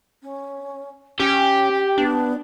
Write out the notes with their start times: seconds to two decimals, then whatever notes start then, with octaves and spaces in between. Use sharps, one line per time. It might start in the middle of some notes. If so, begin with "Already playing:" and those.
0.23 C#4
1.20 C#4 G4 G5
1.98 B3 D4